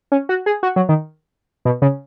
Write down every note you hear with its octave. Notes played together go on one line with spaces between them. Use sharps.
C#4
F#4
G#4
F#4
F#3
D#3
B2
C#3